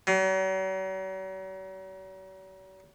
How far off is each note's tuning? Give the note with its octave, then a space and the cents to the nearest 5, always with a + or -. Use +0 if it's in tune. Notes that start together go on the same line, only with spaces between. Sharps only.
F#3 +45